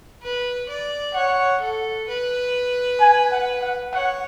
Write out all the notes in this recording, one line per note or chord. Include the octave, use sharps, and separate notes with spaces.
B4
D5
C#5 F#5
A4
B4
G#5
F#5
F#5
C#5 F#5